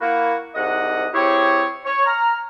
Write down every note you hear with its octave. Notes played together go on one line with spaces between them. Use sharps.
A#3 E4 F#4
C2 G#2 D#5 F#5
C4 E4 G4 G#4 C#5
C#5
A#5 F6